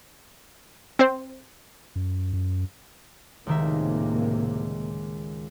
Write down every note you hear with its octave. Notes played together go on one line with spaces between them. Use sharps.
C4 C5
F#2
F#2
C#2 A2 C3 D#3 A#3 E5